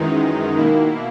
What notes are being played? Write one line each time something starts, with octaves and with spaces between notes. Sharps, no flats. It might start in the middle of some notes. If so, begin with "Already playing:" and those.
Already playing: F#2 D#3 E3 G#3 D#4
B2 D#3 A#3 E4